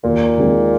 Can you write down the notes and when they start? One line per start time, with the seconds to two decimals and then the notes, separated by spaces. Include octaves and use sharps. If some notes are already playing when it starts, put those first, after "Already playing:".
0.04 D#2 A#2
0.38 D#3 G#3 C4